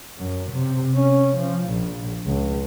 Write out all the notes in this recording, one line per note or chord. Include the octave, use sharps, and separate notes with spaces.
F#2
C3
C#4
F3
A#1
C#2